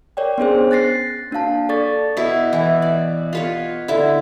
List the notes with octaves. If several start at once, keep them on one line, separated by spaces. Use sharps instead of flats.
A#4 C#5 D5 G5
B3 C#4 D4 G#4 C5
F#6 A6 A#6 C7
A#3 D4 F#4 F5 A5
A4 D5 C#6 A6
B2 E4
E3 E4
D5
F4 B4 C#5
D3 E4